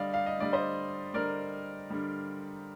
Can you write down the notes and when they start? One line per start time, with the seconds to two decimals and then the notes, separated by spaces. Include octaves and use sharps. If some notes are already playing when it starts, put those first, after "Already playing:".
Already playing: D3 G3 D5 D#5 F5
0.14 F5
0.26 D#5
0.39 D3 G3 D5
0.53 C5 D#5
1.14 D3 G3 A#4 D5
1.90 D3 G3